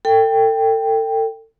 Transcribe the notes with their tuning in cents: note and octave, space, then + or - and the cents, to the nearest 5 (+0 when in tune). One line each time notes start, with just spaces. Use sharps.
A4 +35 G5 +5